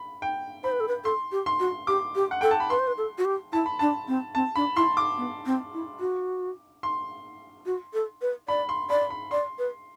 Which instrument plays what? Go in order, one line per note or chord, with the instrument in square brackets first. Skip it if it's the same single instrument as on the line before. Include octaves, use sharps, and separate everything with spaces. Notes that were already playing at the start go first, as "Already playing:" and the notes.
Already playing: [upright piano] B5
G5
[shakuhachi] C5 [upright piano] B5
[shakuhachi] B4
A4
B4
[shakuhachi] A4 [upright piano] C6
[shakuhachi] G4
[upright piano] C6
[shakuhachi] F#4
[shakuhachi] G4 [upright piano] D6
[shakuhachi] G4
[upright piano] F#5
[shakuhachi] A4 [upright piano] G5
[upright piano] A5
B5
[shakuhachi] B4 [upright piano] C6
[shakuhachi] C5
B4
A4
F#4
G4
[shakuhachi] E4 [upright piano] A5
[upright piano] B5
[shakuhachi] D4 [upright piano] A5
[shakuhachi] C4
[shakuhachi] C4 [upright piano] A5
[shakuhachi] D4 [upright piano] B5
[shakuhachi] E4 [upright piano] C6
[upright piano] D6
[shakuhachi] B3
C4
E4
F#4
[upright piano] C6
[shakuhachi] F#4
A4
B4
[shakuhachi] D5 [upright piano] B5
[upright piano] C6
[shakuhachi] D5 [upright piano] B5
[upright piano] B5
[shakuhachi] D5 [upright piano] C6
[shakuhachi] B4